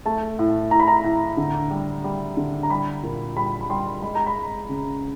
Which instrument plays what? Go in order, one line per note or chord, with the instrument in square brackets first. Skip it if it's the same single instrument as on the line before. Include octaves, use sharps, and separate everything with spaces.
[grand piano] A3 A5
A2
A2 A#5
B5
A#5
A2
D3
G3
G3
D3
A#5
G3 B5
A#2
G3 B5
B5
G3 C6
G#3 B5
A#5
B5
G#3
C#3